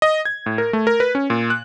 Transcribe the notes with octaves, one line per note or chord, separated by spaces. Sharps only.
D#5
G#6
A2
A#4
A3
A#4
B4
C#4
A#2
F#6